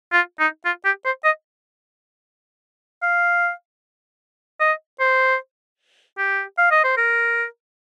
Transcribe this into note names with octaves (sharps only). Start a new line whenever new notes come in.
F4
D#4
F4
G4
C5
D#5
F5
D#5
C5
G4
F5
D#5
C5
A#4